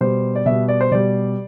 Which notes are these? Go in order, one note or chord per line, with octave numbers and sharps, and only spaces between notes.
B2 G3 C5
D5
B2 G3 E5
D5
C5
B2 G3 D5